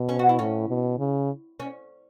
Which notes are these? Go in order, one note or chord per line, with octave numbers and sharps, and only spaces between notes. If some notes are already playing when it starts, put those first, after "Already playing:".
Already playing: B2
C#4
F#4
E4
A2 C#4
B2
C#3
C#4